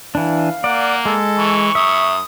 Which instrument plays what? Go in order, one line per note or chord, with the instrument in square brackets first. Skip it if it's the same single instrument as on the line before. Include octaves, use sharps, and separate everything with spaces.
[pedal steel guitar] E3 D4 [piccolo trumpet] F5
[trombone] A#3 [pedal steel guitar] D5 [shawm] F#5
[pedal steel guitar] G#3 [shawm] A4
[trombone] E3 [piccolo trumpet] C#6
[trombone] F#2 [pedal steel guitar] E5 [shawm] D#6